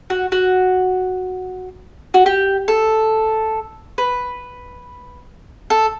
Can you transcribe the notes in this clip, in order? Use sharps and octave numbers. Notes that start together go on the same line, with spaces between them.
F#4
F#4
F#4
G4
A4
B4
A4